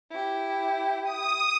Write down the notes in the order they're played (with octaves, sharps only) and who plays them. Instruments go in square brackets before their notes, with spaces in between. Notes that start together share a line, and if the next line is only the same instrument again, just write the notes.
[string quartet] E4 G4
[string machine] D#6